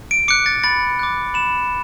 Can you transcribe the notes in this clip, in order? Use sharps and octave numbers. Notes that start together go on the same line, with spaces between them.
D7
D6 F#6 C#7
A6
B5 A6
D6 F#6
B5 E7